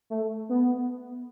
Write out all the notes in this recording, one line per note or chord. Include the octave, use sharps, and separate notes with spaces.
A3
B3